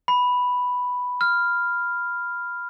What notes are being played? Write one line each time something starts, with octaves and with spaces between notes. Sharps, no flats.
B5
F6